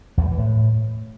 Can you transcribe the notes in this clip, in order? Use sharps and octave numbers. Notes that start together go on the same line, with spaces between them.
E2
G3
E3
A2